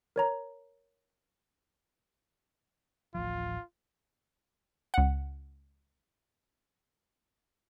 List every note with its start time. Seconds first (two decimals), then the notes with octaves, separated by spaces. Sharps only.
0.16 A#4 C#5 A#5
3.15 D1 A1 F3 F4
4.94 C#2 F#5